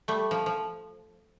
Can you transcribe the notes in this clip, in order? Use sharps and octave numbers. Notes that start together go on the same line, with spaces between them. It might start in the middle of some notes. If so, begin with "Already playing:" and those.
G3 A3
F3
F3